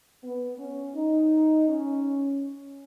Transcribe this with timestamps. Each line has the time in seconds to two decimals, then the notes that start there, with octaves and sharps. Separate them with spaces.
0.22 B3
0.58 C#4
0.94 D#4
1.68 C#4